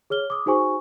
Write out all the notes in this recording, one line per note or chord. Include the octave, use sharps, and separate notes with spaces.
G#4 C#5 F6 G7
D6 D#6
D#4 F#4 G#4 C5 G#5 C#6